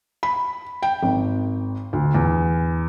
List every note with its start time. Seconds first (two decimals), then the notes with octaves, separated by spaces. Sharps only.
0.23 B5
0.83 G5
1.03 G#1
1.93 D2
2.15 E2